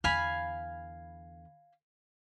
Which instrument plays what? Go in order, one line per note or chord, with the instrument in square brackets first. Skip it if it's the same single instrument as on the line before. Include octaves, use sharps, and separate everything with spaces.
[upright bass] E2 D3 [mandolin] F5 G#5 B5